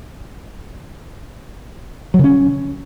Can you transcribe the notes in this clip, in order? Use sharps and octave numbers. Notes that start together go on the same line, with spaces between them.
F#3
C#3
C#4